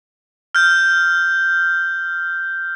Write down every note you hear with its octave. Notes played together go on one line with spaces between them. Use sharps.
F6 G6